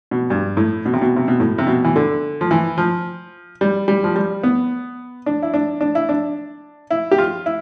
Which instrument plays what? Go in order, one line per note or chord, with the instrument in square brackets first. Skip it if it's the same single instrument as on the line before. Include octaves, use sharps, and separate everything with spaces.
[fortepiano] B2
G2
A2
B2
C3
B2
C3
B2
A2
C3
B2
E3
D3
F3
E3
F3
G3
G3
F3
G3
B3
D4
E4
D4
D4
E4
D4
E4
G4
F4
E4